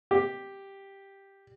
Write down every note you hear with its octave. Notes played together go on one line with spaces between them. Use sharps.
G4